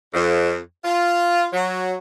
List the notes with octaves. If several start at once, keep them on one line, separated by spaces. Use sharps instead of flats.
F2
F4
F#3